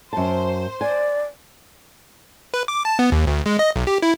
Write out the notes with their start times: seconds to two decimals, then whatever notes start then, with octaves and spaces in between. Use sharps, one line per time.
0.13 F#2 C5 A5
0.81 D5 G#5
2.54 B4
2.68 D6
2.85 A5
2.99 B3
3.12 D#2
3.27 D2
3.46 G#3
3.59 D#5
3.75 B1
3.87 G4
4.02 E4